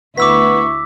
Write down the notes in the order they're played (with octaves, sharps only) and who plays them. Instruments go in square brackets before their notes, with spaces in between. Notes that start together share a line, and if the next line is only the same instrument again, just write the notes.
[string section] D2 E4 [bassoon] B3 [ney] C#6 [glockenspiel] D6 E6 B6